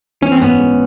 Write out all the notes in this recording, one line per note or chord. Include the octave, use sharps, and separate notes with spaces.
E3 C#4
C4
G#2 B3 C#4
G#3